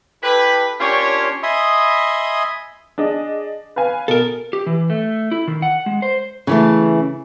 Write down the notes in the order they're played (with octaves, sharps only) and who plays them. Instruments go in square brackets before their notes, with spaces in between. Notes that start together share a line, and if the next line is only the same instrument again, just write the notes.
[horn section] E4 G4 A4 B4
A#3 C#4 D4 F4 G4 C#5
[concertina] D#5 E5 G#5 B5 C6 D#6
[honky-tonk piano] D4 G#4 D#5
B4 F5 G#5
[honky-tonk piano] B2 [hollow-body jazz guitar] A4 A#4
[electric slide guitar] G4
E3
A3
E4
D#3
F#5
G#3
C5
[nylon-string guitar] C#3 E3 A3